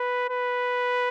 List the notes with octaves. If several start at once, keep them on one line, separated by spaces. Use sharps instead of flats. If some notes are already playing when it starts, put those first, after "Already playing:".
Already playing: B4
B4